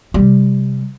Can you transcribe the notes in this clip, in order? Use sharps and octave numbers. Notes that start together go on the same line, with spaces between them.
C3 G3